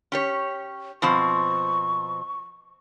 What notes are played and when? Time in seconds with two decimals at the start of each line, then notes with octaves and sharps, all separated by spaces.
0.12 C#4 G4 C#5
1.02 B2 F3 C4 C#6